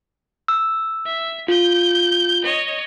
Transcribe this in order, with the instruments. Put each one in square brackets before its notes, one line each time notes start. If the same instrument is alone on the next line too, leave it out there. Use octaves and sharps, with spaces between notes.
[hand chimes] E6
[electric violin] E5
[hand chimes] F4 [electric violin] G6
[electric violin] C#5 D#5